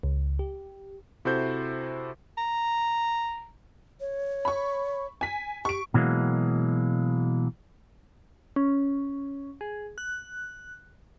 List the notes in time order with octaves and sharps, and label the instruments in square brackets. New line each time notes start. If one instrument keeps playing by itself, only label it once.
[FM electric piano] C#2
G4
[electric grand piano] C3 E4 F#4 A4 C5 G6
[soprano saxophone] A#5
[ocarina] C#5
[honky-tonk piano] B5 C#6
G#5 B6
[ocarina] G4 [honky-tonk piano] C#6 D7
[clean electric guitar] B2 E3 F#3 G#3 A#3
[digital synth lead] C#4
G#4
F#6